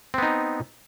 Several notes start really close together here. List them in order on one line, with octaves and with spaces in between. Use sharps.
C4 B3 D#4